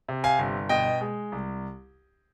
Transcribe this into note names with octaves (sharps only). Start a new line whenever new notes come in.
C3
F5 G#5
G1
B2 D#5 G5
G#3
C2